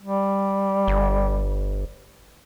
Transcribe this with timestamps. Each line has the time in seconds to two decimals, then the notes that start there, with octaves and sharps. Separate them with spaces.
0.02 G3
0.88 G1